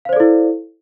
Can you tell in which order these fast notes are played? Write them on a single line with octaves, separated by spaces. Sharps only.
F5 C5 D5 A4 E4